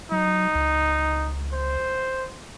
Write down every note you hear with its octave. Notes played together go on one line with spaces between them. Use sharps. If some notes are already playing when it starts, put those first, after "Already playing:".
F#3 D#4
C#2
C5